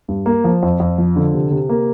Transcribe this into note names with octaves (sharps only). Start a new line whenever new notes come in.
G2
A#3
F3
F2
F2
F3
D3
C3
C3
A#3